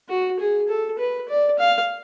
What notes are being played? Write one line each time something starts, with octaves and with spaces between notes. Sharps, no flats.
F#4
G#4
A4
B4
D5
F5